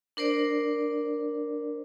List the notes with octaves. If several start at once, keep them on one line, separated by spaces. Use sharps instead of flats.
D4 A#4 C5 D5